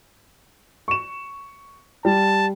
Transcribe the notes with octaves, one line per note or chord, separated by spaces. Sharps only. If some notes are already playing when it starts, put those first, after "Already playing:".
C#6 E7
G3 A5